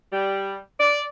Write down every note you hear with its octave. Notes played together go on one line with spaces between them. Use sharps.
G3
D5